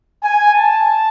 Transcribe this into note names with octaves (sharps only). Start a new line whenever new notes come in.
G#5
A5